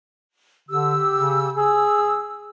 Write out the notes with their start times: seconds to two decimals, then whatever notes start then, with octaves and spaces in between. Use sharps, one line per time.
0.69 D3 G4 E6
1.12 C#3
1.56 G#4 E6